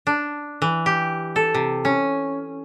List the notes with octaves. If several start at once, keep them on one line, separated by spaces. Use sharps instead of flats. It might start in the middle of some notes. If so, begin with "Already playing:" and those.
D4
E3
G4
A4
C3
C#4